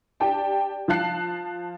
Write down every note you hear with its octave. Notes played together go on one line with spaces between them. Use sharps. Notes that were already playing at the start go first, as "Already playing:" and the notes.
D4 G4 D5 G5 A5
F3 F5 A5 F#6 C7